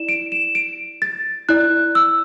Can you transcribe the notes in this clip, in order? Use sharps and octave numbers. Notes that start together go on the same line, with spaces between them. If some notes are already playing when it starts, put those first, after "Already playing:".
Already playing: E4 D5 E7
D7
E7
D7
A6
E4 D5 F#6
E6